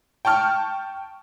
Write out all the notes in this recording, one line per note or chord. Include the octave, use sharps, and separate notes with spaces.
G5 A5 C#6 F6